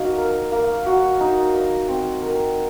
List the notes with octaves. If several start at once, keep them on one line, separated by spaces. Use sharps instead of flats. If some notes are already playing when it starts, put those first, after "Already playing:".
Already playing: A#3 D#4 F#4
A#4
A#3
F#4
D#4
D#5
C4
A#4